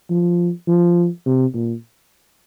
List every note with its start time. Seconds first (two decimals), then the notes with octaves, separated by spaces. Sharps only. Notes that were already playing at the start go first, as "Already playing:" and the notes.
0.10 F3
0.68 F3
1.26 C3
1.54 A#2